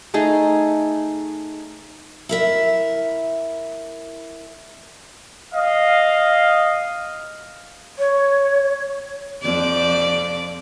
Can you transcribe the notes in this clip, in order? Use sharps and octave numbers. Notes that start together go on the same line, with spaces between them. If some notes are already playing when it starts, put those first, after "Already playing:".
A3 D#4 G#4
E4 A#4 E5
D#5 F5
C#5
F2 D5